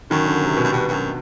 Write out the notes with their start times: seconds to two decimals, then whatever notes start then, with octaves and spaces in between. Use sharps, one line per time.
0.10 F#2 D#3
0.26 D3
0.42 C3
0.57 B2
0.64 F#2
0.72 G2 B2
0.88 G2
0.92 F#2